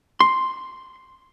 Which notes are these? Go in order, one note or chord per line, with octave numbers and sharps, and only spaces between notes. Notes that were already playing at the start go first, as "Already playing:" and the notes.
C6